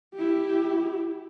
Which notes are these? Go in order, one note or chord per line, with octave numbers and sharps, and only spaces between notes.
E4 G4